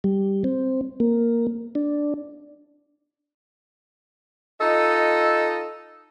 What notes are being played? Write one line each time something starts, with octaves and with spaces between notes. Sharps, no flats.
G3
C4
A#3
D4
D#4 F4 A4 D#5